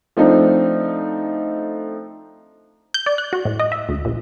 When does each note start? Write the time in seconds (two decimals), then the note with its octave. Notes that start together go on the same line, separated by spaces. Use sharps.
0.17 F3 A3 C4 D4 D#4
2.94 G6
3.06 D5
3.18 F#6
3.33 F#4
3.45 A2
3.60 D#5
3.72 E5
3.89 D2
4.05 A#1